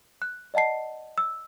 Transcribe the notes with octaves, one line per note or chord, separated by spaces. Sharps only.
F#6
D5 D#5 F#5 A5 C7
E6